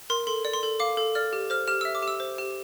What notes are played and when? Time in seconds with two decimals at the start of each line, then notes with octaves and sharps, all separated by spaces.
0.10 A#4 C6
0.27 A4 C6
0.45 D5
0.54 C6
0.63 A4
0.80 F5 D6
0.97 A4
1.15 D5 F6
1.33 G4
1.50 C5 F6
1.68 G4 F6
1.81 E5 E6
1.95 D6
2.03 G4 E6
2.20 C5
2.38 G4